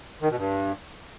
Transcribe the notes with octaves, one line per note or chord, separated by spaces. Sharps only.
D#3
B2
G2